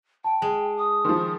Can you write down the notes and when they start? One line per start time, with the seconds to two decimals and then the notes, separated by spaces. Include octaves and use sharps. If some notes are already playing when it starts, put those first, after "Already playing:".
0.24 G5 A5
0.42 G#3
0.77 D#6
1.05 D#3 F3 C6